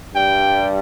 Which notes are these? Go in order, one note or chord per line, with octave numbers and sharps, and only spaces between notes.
G2 G3 G5